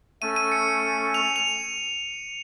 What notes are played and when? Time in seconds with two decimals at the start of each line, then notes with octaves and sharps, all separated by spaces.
0.22 A3 C#4 A4 D#7
0.36 D#7
0.52 C#7
1.14 F7
1.36 F7